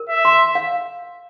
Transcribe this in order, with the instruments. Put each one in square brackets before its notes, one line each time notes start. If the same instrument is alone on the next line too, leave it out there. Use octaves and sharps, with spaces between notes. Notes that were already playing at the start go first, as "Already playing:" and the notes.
Already playing: [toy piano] A#4
[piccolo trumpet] E5
[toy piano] C6
F5